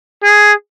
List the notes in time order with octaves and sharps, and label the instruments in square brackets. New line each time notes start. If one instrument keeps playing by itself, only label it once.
[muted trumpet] G#4